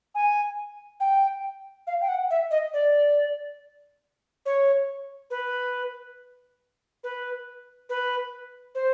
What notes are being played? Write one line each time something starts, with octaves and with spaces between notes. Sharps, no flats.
G#5
G5
F5
G5
F#5
E5
D#5
D5
C#5
B4
B4
B4
C5